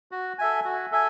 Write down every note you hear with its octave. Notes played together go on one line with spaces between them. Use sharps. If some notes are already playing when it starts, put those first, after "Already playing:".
F#4
A4 E5 G#5
F#4
A4 E5 G#5